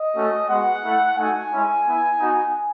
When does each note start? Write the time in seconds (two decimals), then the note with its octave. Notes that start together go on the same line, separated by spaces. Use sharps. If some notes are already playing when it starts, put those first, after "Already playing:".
Already playing: D#5
0.15 A3 C#4 F#4
0.48 G#3 B3 F#4 F#5
0.83 A3 E4
1.17 A3 D#4 F#4 G#5
1.52 G#3 C#4 E4
1.86 B3 E4
2.20 B3 D#4 F#4